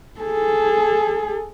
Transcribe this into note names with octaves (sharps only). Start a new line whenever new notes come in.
G#4 A4